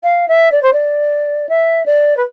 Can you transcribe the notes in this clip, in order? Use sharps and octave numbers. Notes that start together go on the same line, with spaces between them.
F5
E5
D5
C5
D5
E5
D5
B4